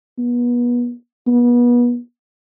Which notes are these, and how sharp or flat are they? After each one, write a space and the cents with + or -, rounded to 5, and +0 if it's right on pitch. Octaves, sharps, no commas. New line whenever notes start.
B3 -30
B3 -30